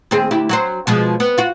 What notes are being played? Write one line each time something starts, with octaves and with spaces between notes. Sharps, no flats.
D#2 C4 G#4
D2 E4 G4
F#3 F#4 C5
B2 F3 G#3
B3
F4 F#4